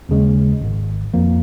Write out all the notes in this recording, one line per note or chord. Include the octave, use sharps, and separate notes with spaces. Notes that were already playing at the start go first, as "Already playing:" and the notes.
D#2 C#3 G#3
G#1 G#2 D#3
F2 F3 A#3